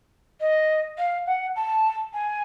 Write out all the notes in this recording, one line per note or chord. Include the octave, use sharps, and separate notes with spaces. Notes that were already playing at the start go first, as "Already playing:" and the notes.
D#5
F5
F#5
A5
G#5